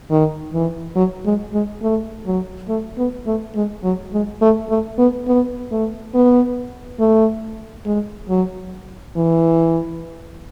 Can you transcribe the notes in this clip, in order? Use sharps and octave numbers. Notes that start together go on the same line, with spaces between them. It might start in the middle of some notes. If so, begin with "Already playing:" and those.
D#3
E3
F#3
G#3
G#3
A3
F#3
A3
B3
A3
G#3
F#3
G#3
A3
A3
B3
B3
A3
B3
A3
G#3
F#3
E3